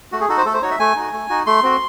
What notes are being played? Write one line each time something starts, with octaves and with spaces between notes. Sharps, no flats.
A3 F#4
G#4
D#4 F#4 A4
C5
A3 A4
C5
D#4 F#4 C#5
E5
A3 G#5
D#4 F#4
A3
D#4 F#4
A3 C6
C4 F#4